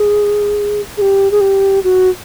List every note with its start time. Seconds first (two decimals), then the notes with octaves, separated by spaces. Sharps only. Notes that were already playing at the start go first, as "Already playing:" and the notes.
Already playing: G#4
0.97 G#4
1.01 G4
1.31 G#4
1.41 G4
1.84 F#4